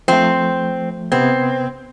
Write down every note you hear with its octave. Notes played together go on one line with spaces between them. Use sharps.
F3 A3 C4
C3 B3 C4 G#6